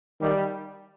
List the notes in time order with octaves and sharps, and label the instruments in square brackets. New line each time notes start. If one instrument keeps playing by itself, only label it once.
[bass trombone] D#3 [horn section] G3